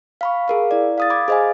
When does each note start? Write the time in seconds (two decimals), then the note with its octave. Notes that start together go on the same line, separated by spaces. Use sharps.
0.21 F5 B5 C#6
0.48 G#4 A#4 F5
0.71 E4 D5
0.98 F5 D#6 A6
1.10 B5 D6 G#6
1.28 G#4 C5 D#5 F5 G#5